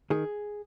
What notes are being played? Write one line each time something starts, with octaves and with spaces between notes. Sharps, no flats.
D#3 G#4